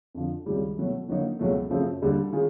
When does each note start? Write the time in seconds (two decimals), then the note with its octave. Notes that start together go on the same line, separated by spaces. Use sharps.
0.14 F2 D3 F3
0.46 C#2 C3 D#3 G3
0.77 B2 F#3 A3
1.08 D3 F#3 A#3 D#4
1.39 C#2 B2 F#3 A3
1.71 F#2 C#3 F3 A3 C4
2.02 D#2 D3 G3
2.32 D#3 G#3 C#4 F4 G#4